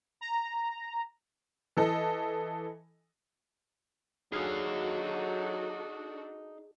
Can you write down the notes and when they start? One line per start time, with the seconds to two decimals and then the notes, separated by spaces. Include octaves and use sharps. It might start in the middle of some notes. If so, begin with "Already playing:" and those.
0.21 A#5
1.77 E3 A4 D#5
4.32 F#3 D4 D#4 F#4 G#4 A4 F5